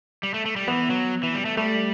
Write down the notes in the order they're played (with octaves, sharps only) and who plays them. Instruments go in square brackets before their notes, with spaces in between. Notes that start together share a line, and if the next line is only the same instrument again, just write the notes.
[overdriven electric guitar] G3
A3
A3
G3
[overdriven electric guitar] E3 [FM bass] B3
[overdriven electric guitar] F#3
E3
G3
A3
[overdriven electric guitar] G3 [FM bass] A3